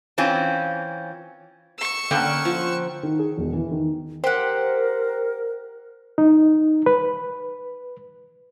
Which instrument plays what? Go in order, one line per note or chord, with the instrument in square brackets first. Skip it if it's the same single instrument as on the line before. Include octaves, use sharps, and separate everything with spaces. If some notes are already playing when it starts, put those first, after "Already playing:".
[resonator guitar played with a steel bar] E3 C4 C#4 F4
[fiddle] C#6 E6
[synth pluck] D3 [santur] A#3 F#5 G5 [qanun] C#4
[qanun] F3
[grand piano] D#3
G#4
E1
E3
D#3
[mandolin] G4 F#5 [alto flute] A#4 [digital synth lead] C5
[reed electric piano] D#4
B4